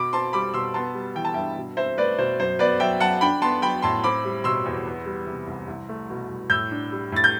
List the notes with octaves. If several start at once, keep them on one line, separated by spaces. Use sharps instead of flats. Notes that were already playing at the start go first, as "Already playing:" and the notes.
Already playing: B2 B5 D6
C4 A5 C6
G3 B5 D6
B2 C6 E6
B3 A5 C6
G3
E3 G5
A5
G2 E5 G5
B2
C4 C5 E5
A3 B4 D5
B2 C5
F#2 C5
B3 B4 D5
F#3 E5 G5
F#2 F#5 A5
D4 G5 B5
B3 A5 C6
F#3 G5 B5
A2 A5 C6
C4 B5 D6
G3
B2 C6 E6
E2
B3
G3
C3
C2
C2
A3
B2
C2
A2 E6 G6
D4
G3
A2 A6
G6